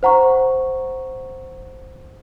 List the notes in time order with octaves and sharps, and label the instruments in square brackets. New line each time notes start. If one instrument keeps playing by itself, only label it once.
[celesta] C5 F#5 A#5 C#6